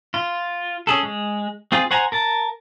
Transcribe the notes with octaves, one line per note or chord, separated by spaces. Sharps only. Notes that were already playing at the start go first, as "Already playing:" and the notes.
F4
C#4 G#4 A4
G#3
C4 F4 G#4
C5 F#5 G#5 A#5
A#4 A5